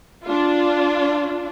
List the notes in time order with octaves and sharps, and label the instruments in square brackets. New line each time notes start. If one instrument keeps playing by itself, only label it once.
[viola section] D4 F4